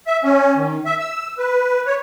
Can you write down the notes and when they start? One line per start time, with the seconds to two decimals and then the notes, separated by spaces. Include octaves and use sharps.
0.07 E5
0.24 C#4
0.56 D#3
0.86 E5
1.00 E6
1.38 B4
1.86 C#5